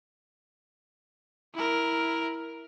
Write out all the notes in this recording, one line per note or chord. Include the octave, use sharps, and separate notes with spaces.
E4 A#4